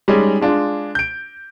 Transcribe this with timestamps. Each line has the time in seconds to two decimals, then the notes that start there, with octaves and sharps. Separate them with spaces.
0.08 G3 G#3 C#4 D#4
0.41 G#3 D4 F4
0.95 G6 D7